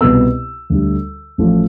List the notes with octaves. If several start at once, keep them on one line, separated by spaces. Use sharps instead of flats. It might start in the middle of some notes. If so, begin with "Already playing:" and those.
C2 B2 B3 E6
D2 D3 G3
A1 A2 F3 A3